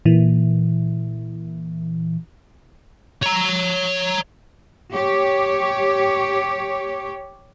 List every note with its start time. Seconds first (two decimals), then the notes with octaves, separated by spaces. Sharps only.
0.05 A#2 E3
3.23 C#5 A#5
4.92 G4 C#5